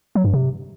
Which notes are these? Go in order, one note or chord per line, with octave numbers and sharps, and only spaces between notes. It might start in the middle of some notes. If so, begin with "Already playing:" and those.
F#3
G2
C3